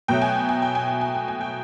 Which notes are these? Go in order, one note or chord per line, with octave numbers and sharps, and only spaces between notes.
B2 F#3 A3 G5
G#5
G5
G#5
G5
G#5
G5
G#5
G5
G#5
G5